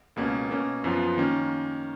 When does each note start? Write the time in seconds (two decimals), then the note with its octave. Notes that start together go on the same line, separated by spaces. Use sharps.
0.16 C#2 B2 A#3 C#4
0.50 B2 A#3 C#4
0.84 F#2 F3 B3 F4 B4
1.17 D#3 A#3 C#4